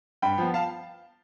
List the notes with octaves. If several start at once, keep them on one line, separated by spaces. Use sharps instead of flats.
G2 G5 B5
F3 B3
F5 A5